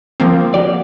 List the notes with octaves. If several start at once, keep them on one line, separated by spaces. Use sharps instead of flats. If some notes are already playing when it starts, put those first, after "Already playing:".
F3 A#3 C4
F#4 G4 D5